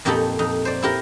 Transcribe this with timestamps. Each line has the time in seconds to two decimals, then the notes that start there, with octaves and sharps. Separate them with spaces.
0.05 F2 A#2 D#4 G4 A4 B5
0.39 F2 D#4
0.65 C5 D5
0.82 E4 G4 A#4